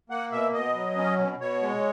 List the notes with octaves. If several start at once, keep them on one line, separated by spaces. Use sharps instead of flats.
A#3 F#5
B2 E5
B2 D#5
F#3
C#4
B2
B2 C#5
G#3